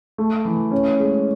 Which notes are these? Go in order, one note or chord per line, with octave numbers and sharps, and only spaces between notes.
A3
E3
C#4
G#3